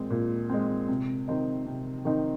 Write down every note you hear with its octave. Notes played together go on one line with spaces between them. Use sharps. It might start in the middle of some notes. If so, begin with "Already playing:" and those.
Already playing: A#2 G#3 C4
A#2
G#3 C4
C3
D#3 C4 D#4
C3
D#3 C4 D#4